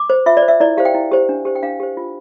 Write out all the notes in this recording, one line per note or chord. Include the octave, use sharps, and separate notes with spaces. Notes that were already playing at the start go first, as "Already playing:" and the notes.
Already playing: D6
C5
F4 E5
D5
C5
E5
E4 D5
G4 C5 F5
G5
E4
G4 C5
D4
G4 C5
G5
D4 F5
G4 C5
F4